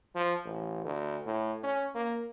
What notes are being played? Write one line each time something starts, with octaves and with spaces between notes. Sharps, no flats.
F3
A1
D2
A2
C#4
A#3